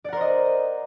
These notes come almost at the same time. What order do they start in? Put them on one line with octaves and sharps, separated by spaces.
D5 F#5 A#4 C5 D#5